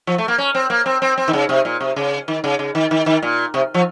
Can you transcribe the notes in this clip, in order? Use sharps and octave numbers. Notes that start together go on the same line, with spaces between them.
F3
A3
A#3
C#4
C4
A#3
C4
C4
C4
D#3
C#3
C3
A#2
C3
C#3
D#3
C#3
C#3
D#3
D#3
D#3
A#2
C3
F3